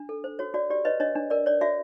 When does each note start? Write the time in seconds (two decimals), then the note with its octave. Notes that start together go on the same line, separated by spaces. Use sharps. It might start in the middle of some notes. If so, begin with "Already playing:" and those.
Already playing: D4
0.09 A4
0.24 C5
0.39 F#4 C#5
0.54 F#4 D5
0.70 G4 D5
0.85 B4 C#5 D#5
1.00 D4 C#5 D#5
1.15 D4
1.30 A#4 D5
1.46 C#5 D5
1.61 F#4 D5 E5